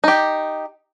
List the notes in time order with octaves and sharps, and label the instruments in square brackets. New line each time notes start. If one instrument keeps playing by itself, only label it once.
[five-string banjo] D#4 G4